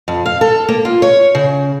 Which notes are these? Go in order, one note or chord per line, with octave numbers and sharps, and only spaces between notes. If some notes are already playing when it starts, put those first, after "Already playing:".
F2
F5
A4
A#3
F4
C#5
C#3